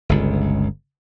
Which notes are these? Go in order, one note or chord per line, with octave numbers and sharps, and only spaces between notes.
G1 C#2